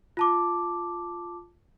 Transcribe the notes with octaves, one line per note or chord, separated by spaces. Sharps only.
F4 A5 D6